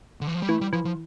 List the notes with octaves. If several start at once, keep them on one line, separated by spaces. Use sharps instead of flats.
D3
E3
F3
G3
E3 A3
G3
E3 F3
F3